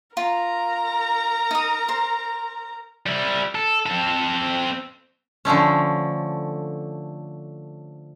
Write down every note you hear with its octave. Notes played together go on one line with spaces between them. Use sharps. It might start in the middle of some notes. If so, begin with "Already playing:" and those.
F4 A#4 A#5
D#4 D#6
C5
G3 E4
A4
C4 A4
D3 F3 A3 C#4